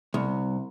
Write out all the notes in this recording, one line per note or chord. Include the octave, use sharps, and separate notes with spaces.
C2